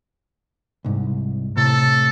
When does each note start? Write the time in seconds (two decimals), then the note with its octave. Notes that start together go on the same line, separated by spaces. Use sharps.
0.85 C2 G#2
1.57 A2 C3 A4 A5